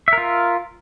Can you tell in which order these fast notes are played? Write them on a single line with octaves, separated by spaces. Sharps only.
E5 A#4 F4